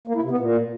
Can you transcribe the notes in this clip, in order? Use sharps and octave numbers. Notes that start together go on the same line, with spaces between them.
A#3
E4
C3
B3
A#2